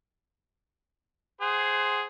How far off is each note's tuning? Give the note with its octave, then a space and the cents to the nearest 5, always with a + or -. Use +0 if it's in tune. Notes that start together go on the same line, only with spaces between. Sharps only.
G#4 +0 C5 +0 F#5 +35